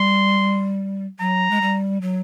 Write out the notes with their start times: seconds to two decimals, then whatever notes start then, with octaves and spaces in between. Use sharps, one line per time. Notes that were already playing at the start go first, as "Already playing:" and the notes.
Already playing: G3 C6
1.19 F#3 A#5
1.51 G#3
1.61 G3
2.02 F#3